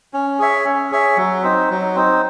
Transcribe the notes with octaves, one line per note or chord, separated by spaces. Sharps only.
C#4
G#4 C#5 E5
C#4
G#4 C#5 E5
F#3
C4 D#4
F#3
C4 D#4